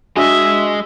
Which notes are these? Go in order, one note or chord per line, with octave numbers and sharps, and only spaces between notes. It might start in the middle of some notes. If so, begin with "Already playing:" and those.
G#3 D4 F#4 D#5 E5 G#5